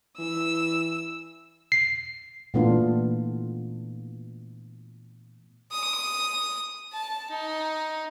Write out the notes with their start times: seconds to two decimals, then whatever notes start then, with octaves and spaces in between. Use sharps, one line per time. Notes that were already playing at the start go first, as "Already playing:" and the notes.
0.19 E3 E6
1.72 C7
2.54 A#2 E3 A3 B3 D4 F4
5.72 D#6
6.93 A5
7.31 D#4